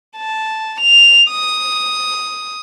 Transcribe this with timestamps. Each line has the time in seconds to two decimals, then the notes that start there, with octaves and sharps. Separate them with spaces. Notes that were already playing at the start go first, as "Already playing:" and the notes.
0.17 A5
0.80 F7
1.30 D#6